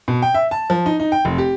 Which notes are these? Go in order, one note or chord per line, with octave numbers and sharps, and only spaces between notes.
B2
G5
E5
A5
F3
D#4
D#4
G5
F1
G4